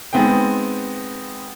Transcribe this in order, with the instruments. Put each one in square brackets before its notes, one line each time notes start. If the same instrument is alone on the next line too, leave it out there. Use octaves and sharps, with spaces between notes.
[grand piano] G#3 B3 C4 D#4 G5